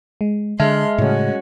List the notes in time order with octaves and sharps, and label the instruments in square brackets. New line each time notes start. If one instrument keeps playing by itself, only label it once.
[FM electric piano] G#3
[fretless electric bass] D3 [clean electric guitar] G#3 [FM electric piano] E5 A5 F6 [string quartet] C6
[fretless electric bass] A2 C#3 [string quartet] G3 C#4 F#4